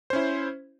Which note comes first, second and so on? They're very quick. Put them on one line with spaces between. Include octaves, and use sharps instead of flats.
C5 C#4 E4